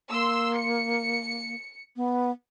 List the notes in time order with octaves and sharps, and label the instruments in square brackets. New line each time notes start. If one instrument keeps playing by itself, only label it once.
[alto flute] A#3 [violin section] C6 E6
[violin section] C#7
[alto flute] B3